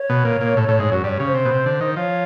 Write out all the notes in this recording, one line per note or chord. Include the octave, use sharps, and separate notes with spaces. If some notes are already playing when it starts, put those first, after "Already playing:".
Already playing: C#5
B2
A#2
A#2
A2
A2
G#2
F#2
G2 C#5 D5
C#3
C5
C3
B2
C3
D3
D#3
F3 C#5